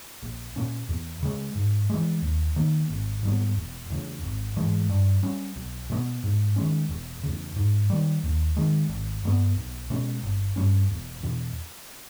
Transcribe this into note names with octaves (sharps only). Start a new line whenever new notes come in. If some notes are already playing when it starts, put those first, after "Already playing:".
A#1
A#2 A#3 C#4
E2
C#3 G#3
G#2
E3 G#3
D#2
D#3 A#3
G#1
G#2 G3 B3
E1
E2 C#3
G#1
G#2 E3 G#3
G2
G3 C#4
B1
B2 G#3 B3
G#2
D#3 G#3 C#4
E1
E2 C#3
G#2
D#3 G3
D#2
D#3 G#3
G#1
G2 G3 B3
B1
B2 G#3 C#4
G1
G2 G3 C#4
E1
E2 B2